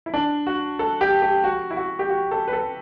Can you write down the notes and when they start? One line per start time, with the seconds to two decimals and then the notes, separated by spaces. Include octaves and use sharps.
0.06 E4
0.14 D4
0.47 F#4
0.79 A4
1.01 G4
1.22 G4
1.44 F#4
1.71 E4
1.77 F#4
1.99 G4
2.09 F#4
2.31 A4
2.48 B4
2.53 A4